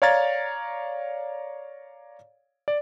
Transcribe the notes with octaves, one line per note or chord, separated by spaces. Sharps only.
C#5 D5 F5 A#5 G#6 A6
D5